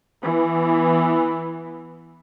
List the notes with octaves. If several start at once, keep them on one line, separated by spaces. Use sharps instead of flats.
E3 B3